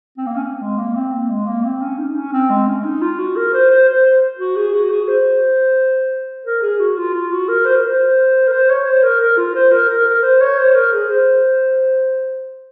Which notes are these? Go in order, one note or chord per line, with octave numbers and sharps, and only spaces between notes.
C4
A#3
C#4
C4
G#3
A#3
C4
A#3
G#3
A#3
C4
C#4
D#4
C#4
C4
G#3
C#4
D#4
F4
F#4
A#4
C5
C5
C5
C5
F#4
G#4
F#4
G#4
C5
A#4
G#4
F#4
F4
F4
F#4
A#4
C5
A#4
C5
A#4
C5
C#5
C5
A#4
A#4
F4
C5
A#4
A#4
A#4
C5
C#5
C5
A#4
G#4
C5